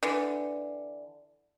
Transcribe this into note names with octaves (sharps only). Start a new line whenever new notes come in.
D3 E3